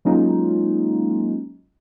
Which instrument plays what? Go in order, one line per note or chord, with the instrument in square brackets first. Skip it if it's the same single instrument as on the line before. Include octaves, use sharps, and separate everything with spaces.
[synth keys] F#3 G#3 A#3 C#4 D#4 F4